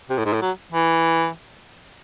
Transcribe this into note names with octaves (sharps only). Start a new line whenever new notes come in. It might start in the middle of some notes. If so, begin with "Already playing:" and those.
C3
A2
G#2
A2
F#3
E3